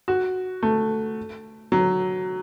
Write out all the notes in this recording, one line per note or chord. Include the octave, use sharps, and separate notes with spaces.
F#4
A3
F#3